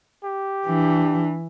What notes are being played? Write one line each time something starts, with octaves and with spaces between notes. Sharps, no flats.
G4
E3 D4